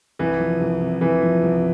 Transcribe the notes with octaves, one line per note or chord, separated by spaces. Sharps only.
C2 E3
F3
C2
C3
C2 E3
F3
C2